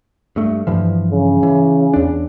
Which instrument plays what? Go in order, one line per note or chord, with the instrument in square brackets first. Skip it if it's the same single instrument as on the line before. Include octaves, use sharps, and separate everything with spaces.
[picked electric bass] G2 A3
G2 E3 F3
[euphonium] C#3
[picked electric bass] E3
E2 D4